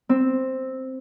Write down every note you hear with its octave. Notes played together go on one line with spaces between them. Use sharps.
C4